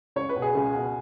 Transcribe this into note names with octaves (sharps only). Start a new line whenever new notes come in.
C#2 C#5
B4
B2
G#4
C#2
B2